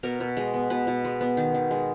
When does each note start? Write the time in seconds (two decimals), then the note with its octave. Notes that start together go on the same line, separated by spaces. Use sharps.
0.03 B2 A#4
0.20 B2
0.37 G#3
0.54 B3
0.70 B2 B4
0.87 B2
1.05 G#3
1.21 B3
1.37 D#3
1.54 D#3
1.71 G#3